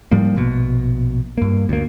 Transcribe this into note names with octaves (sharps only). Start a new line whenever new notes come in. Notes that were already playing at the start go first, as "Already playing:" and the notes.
G#2 F3 G3 A#3
A#1 B2
G2 A#3
D2 A#3